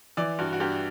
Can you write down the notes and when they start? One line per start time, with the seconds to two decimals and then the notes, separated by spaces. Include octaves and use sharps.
0.17 E3 D5
0.39 G2 F#4
0.53 F#4
0.60 G2 G4